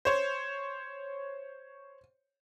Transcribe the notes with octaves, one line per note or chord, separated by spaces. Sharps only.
C5 C#5